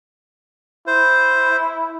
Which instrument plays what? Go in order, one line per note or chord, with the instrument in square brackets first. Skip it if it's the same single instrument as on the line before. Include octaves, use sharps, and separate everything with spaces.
[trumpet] E4 [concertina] C5